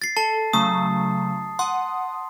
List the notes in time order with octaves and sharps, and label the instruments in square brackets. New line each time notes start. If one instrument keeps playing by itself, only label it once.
[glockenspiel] A6 C7
[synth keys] A4 [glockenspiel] A5
[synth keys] C#3 F#3 A3 [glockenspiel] D#6
[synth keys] F#5 D#6 [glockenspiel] C6